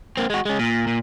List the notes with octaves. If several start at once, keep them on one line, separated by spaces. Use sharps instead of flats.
A#3 C4
G#3 F#4
G#3 C#4
A#2
A#2